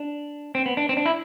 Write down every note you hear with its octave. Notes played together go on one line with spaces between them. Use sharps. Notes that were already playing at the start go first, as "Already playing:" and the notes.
Already playing: D4
C4
B3
D4
C4
D4
E4